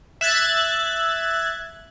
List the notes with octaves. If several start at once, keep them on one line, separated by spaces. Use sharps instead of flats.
E5 F#6 G#6 A6